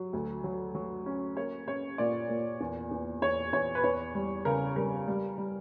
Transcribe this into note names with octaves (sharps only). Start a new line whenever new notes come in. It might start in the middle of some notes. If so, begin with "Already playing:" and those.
Already playing: F#3
D2
F#3
F#3
C#4
A#3 C#5
C#4 C#5
A#2 D5
A#2
E2
E2
E2 C#5
E2 C#5
B4
E2 C#5
G3
C#3 A#4
G3 A#4
G3
G3